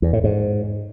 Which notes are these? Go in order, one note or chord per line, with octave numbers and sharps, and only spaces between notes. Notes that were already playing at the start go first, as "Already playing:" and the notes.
E2
A2
G#2